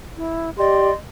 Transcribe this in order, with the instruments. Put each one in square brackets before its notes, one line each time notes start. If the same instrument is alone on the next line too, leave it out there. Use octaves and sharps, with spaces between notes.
[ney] E4
[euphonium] G4 [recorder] D5 [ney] D#5 [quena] C6